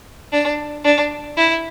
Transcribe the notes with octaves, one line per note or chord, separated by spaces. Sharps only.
D4
D4
E4